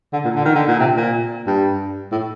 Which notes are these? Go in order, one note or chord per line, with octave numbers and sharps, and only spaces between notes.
D3
A#2
D3
D#3
D3
A#2
C3
A#2
G2
A2